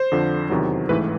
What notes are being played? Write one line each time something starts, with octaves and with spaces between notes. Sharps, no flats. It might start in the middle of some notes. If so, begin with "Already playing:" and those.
Already playing: C5
F2 D3 F3
E2 C3 D#3 F#3
A1 G#2 E3 A3 B4